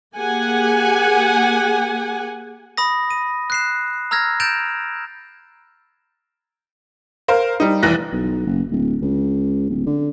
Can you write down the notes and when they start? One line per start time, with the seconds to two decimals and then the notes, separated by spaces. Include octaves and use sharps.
0.16 A#3 G4 G#4 F#5 G#5
2.77 B5 D#6 A#6
3.10 D#7
3.50 F#6 C7 E7
4.11 A#5 E6 F6 G#6 A#6
4.40 G6 A6 D7 E7 F7
7.28 A#4 C5 F5
7.60 G3 D#4
7.83 F1 E3 F#6 A#6
8.13 B1
8.47 F#1
8.71 D1
9.01 C#2
9.69 D1
9.86 D3